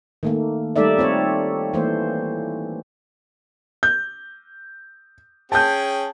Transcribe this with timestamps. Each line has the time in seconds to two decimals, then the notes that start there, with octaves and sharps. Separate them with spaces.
0.23 D#3 A3 A#3
0.76 G3 A3 D#4 A4 D5 E5
0.98 C4 F4 C#5
1.73 E3 A3 A#3 C5
3.83 G6
5.52 C#4 G#4 G5 A5 G6